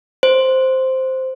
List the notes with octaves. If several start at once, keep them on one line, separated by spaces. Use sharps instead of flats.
C5